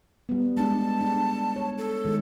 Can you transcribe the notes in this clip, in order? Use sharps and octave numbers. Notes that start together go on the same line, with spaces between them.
G3 B3
G#3 D4 A5
D4
C#5
A4
D#3 G#3